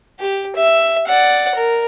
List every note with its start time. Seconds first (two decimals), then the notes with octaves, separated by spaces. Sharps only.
0.19 G4
0.56 E5
1.07 D5 F#5
1.55 A#4